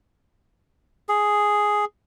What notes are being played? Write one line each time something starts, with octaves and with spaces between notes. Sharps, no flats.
G#4